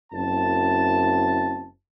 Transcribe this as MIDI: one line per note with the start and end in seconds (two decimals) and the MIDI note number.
0.13 1.67 30
0.13 1.67 42
0.13 1.67 60
0.13 1.67 64
0.13 1.67 81